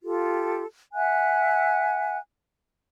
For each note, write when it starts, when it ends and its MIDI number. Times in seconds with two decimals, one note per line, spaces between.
0.03 0.63 65
0.03 0.63 67
0.03 0.63 69
0.93 2.18 76
0.93 2.18 78
0.93 2.18 80
0.93 2.18 90